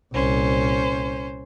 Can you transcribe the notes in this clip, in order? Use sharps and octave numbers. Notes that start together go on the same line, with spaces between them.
C2 A#2 C#4 C5